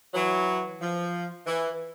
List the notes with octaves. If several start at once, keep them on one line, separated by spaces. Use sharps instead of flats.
E3 F#3
F3
E3